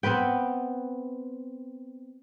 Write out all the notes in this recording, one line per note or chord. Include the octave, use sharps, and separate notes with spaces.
B3 C4 B4 G5